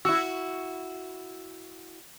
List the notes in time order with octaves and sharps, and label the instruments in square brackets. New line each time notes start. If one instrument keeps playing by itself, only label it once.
[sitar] E4 F#4 [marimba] E6